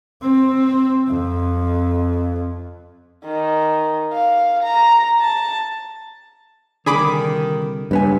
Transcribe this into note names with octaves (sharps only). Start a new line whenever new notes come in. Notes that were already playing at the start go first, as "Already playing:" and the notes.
C4
F2
D#3
F5
A#5
A5
C2 D3 D#3 G#4 B5 D6
C#2 G2 B3 G#5